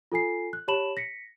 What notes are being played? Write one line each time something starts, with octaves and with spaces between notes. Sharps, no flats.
F4 A4 G#5 C7
F#6
G4 C#5 A5 B5 E7 F#7
A#6 B6 C#7